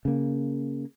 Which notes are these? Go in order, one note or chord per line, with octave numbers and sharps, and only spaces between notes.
C#3 A#3